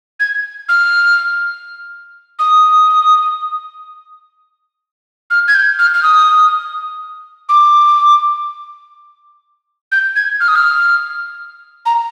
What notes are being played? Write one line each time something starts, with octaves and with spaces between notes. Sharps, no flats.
G#6
F6
D#6
F6
G#6
G6
F6
F6
D#6
D6
G6
G#6
F6
D#6
F6
A#5